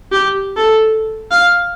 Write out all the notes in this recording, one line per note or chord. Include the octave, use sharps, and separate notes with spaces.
G4
A4
F5